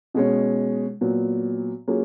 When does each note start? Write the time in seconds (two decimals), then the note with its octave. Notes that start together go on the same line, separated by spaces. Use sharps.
0.14 B2 G#3 C#4
1.01 A#2 F#3 B3
1.88 F#3 A#3 C#4 F4 G#4